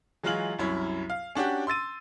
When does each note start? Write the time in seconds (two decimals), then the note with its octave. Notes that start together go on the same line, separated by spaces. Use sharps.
0.23 E3 F#3 G#3 F4 F6 F#7
0.59 C2 F#2 E4 C#5
1.10 F5
1.35 C#4 D4 F#4 G4
1.67 C6 E6 A6 D#7